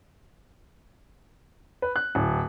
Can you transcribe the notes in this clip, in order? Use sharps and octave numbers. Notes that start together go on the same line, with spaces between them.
B4
F#6
D1